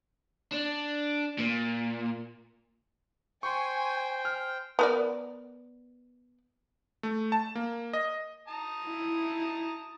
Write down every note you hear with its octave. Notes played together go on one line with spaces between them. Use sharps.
D4
A#2
C5 G5 G#5 C6 C#6
F6
B3 A#4 D5
A3
A5
A#3
D#5
A5 A#5 D#6
E4